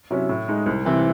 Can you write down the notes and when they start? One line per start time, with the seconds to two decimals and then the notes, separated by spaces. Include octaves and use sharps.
0.11 C3 F#3 C#4 E4
0.29 A2
0.48 G#3 D#4
0.66 C2
0.85 C3 E3 C4